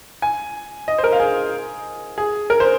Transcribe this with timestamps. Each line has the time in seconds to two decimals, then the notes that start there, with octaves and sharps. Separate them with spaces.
0.22 G#5
0.88 D#5
0.98 C5
1.04 A#4
1.12 F5
1.20 G#4
2.18 G#4
2.50 A#4
2.60 C5